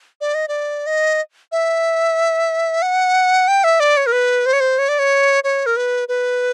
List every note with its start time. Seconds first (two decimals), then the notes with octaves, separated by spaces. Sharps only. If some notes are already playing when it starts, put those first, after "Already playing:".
0.21 D5
0.35 D#5
0.48 D5
0.87 D#5
1.52 E5
2.82 F#5
3.48 G5
3.64 E5
3.80 D5
3.97 C#5
4.06 A#4
4.12 B4
4.46 C5
4.53 C#5
4.60 C5
4.79 C#5
4.89 D5
4.99 C#5
5.44 C#5
5.66 A#4
5.77 B4
6.08 B4